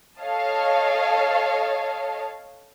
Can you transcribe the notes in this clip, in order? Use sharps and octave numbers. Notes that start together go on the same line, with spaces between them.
A4 C#5 D#5 F5 A5